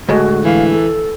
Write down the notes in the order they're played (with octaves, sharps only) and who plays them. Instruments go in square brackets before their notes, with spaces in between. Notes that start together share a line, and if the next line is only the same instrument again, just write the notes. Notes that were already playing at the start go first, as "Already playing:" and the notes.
[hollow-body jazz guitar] D2 A2 G#3 [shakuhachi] F#4
[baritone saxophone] E3 [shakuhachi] F5
[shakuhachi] A4